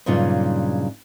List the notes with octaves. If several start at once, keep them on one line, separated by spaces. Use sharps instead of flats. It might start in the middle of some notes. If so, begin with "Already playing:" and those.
G2 A#2 C#3 F#3 D#4 F4